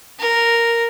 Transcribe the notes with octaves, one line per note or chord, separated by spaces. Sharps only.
A#4